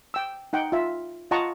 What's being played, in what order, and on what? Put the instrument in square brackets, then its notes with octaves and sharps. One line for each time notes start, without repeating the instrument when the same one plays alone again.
[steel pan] G5 E6
D#4 F#5 G5
F4 E5
F4 D#5 F#5 A5 A#5 C#6